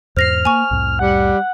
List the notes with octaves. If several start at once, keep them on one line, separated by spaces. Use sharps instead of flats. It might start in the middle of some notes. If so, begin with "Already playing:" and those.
E2 G#2 C5 F6 A#6 C7
A#3 G#5 C#6
C2 F2 A2
G3 F#5